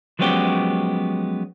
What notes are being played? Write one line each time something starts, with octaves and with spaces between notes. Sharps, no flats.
F3 F#3 G#3 B3 C#4 G4